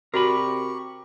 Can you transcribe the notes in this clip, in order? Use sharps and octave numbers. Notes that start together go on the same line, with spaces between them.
C3 F#4 G4 A#4 D5 B5 C#6